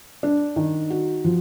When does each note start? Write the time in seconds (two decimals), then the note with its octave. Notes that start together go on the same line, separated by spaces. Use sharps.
0.23 D4
0.56 D#3
0.90 F#4
1.25 F3